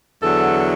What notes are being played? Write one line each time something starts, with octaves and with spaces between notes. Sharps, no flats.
E2 D3 F#3 A4